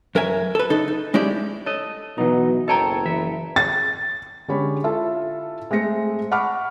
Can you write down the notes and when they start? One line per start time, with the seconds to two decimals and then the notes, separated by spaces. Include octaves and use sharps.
0.15 F#2 A#4 E5 G#5
0.55 A4 B4
0.70 C#3 D#4 A4
0.88 D#4
1.14 G#3 C#4 E4 G4 D5
1.66 A4 C#5 D#5
2.18 B2 E3 F#3 D#4 E4
2.68 F#1 A4 C#5 D#5 G5 A5 A#5
3.06 E3 E5
3.56 A6
4.48 D3 G#3 C#4 G4 C#5 B5
4.84 E4 F4 A4 E5 A5
5.71 G#3 A3 C4 A#6 C#7
6.31 F#5 A5 B5 C#6 D6 F6